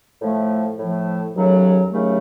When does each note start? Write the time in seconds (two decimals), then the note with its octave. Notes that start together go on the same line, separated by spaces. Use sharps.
0.22 A2 F3 A3
0.79 A2 F3 A3
1.35 D#2 C#3 F#3 A3
1.91 D#2 C#3 F#3 A3